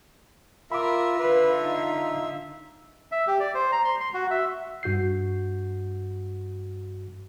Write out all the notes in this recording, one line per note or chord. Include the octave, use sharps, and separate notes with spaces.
F4 A#4 E5 B5 D6
D3 F4 B4
D#4
E5
G4
D5
C5
A#5
C6
C6
F#4
E5
G2 F#4 G6 C7